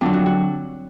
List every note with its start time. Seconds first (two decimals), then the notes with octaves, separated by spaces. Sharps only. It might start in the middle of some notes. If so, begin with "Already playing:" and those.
0.01 F2 D3 F#3 D4
0.13 F#4
0.26 F#4